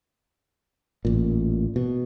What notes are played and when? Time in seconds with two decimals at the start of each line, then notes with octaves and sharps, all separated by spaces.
1.05 A1 A#2
1.76 B2